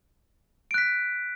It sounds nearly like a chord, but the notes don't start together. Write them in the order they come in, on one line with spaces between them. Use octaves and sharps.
D7 F#6 B6